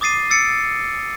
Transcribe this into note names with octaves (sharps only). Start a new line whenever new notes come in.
D6 D#6 A6 C7 D#7
E6 A6 C#7 D7